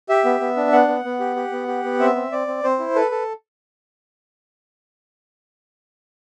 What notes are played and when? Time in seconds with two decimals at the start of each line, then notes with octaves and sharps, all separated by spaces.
0.09 G4 E5
0.25 B3
0.40 B3
0.57 D4
0.72 B3 F#5
0.88 B3
1.04 B3
1.20 G4
1.36 G4
1.52 B3
1.68 G4
1.84 B3
2.00 C4 E5
2.16 C4
2.32 C4 D5
2.48 C4
2.64 C4 C5
2.79 E4
2.95 A4 B4
3.11 A4